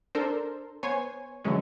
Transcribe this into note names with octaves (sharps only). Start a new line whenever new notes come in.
D4 A4 A#4 C5
B3 C5 C#5 G#5
D3 E3 F#3 G#3 C#4